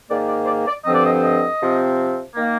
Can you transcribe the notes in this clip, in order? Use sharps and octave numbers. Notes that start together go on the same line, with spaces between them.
G#2 D#3 A#3 D5
D5
C5
D5
D5
G2 D3 F3 C4 D#5
D5
D#5
D#5
C3 F3 C4
D#3 A#3